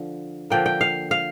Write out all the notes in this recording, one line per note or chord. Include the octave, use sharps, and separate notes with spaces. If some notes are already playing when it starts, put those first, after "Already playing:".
Already playing: D3 F3
D3 F3 A#3 G5
G5
F5
F5